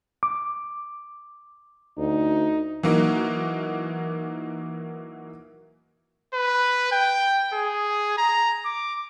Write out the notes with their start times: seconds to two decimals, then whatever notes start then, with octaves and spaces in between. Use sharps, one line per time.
0.23 D6
1.98 D2 D#4
2.83 E3 F#3 A#3 D#4 F#4
6.34 B4
6.92 G5
7.53 G#4
8.18 A#5
8.65 D6